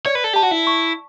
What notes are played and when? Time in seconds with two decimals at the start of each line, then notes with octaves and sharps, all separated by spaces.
0.05 C#5 D5
0.15 B4
0.24 A4
0.34 G4 A5
0.43 F#4
0.51 E4
0.67 C#6